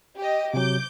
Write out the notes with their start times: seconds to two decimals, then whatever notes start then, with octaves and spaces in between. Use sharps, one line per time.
0.17 G4 D#5
0.54 C3 F#3 D6 G6